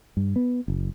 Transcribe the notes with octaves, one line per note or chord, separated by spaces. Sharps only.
G2
B3
F#1